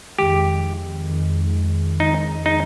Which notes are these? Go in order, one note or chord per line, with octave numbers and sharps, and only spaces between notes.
F2 D#3 G#3 G4
F2 D#3 G#3
F2 D#3 G#3 D#4
D#4